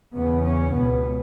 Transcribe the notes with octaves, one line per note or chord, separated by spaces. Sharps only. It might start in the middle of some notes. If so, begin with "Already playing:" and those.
E2 C#3 B3
C#4
C#2 B2 B3